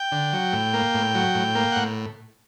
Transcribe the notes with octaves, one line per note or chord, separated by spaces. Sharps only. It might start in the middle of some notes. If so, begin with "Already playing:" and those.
Already playing: G5
D3
F#3
A2
A#3
A2
F#3
A2
A#3
A2 F#5